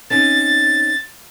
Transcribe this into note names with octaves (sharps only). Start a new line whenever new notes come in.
C4 C#4 D#4 A6